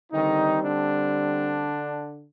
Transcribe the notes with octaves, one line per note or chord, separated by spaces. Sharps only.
D3 D#3 G3 C4 D#4
D3 D4